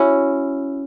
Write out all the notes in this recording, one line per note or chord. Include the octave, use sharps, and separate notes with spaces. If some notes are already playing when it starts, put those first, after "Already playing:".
Already playing: C#4 E4 F#4